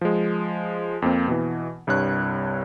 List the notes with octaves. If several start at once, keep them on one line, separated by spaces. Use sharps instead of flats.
F3 G#3
F2 A#3 C4
B2 E3
C2 G2 C#5 F#6